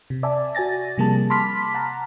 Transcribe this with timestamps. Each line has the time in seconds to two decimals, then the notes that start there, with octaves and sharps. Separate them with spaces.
0.10 C3
0.23 D5 E5 G#5 A5
0.55 F#4 D5 G#5 A6 A#6
0.98 C3 F3 G3 A#3 G#4 A5
1.30 A5 B5 C6 D6 F6 B6
1.74 F#5 A5 A#5